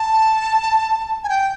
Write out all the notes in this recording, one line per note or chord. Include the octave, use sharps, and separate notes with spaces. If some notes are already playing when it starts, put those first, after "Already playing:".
Already playing: A5
G#5
G5